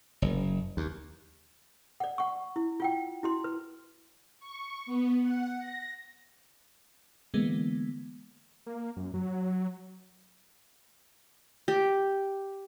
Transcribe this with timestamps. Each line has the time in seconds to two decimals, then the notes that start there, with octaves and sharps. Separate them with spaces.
0.22 F#1
0.77 D#2
2.00 D5 F#5
2.18 F#5 C#6
2.56 E4
2.80 F4 F#5 G5
3.23 E4 F#4 C6
3.44 B4
4.40 C#6
4.86 B3
5.23 F#5
5.59 A#6
7.34 D3 E3 G#3 A#3 B3
8.67 A#3
8.96 F#2
9.14 F#3
11.68 G4